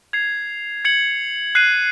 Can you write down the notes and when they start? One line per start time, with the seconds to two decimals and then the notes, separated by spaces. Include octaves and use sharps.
0.13 G#6 C7 F7
0.85 G#6 C#7 F#7
1.55 F#6 C7 D#7